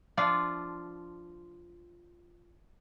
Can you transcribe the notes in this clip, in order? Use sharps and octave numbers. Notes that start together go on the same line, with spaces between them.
F3 D4 F4